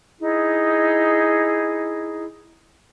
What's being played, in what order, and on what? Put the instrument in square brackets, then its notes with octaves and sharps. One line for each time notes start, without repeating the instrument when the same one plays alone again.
[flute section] D#4 E4 G#4